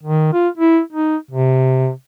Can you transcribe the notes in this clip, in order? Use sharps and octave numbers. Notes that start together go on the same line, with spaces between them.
D#3
F4
E4
D#4
C3